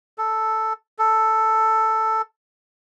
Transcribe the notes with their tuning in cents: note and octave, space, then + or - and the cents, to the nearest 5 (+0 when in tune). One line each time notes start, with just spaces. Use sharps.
A4 +0
A4 +5